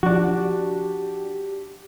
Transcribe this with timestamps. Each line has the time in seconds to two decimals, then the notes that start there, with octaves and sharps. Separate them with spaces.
0.03 F3 D4 F#4 G4